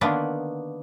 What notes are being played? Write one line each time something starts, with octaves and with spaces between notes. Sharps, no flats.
D3 D#3 A#3 B3 D4 B4